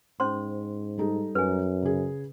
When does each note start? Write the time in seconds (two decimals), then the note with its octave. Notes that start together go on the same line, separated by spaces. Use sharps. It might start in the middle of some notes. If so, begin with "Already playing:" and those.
0.20 G#2 C#4 C5 C6
0.98 G3 D#4 A4
1.35 F#2 B4 G#5
1.83 C#3 G#4